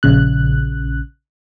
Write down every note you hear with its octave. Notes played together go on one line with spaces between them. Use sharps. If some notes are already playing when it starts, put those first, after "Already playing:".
A#1 C#3 F#6